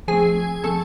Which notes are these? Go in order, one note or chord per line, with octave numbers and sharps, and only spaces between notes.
F3 A3 C4 G#4 G#5
F3 A3 C4 A4 A5